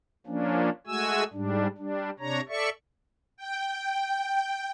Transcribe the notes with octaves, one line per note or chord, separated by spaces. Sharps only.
F3 A#3 C#4 D4
G#3 A3 F#4 G#5 E6
G#2 G3 D4
G3 D4
C3 D4 C#5 A#5
A4 D5 E5 C#6
G5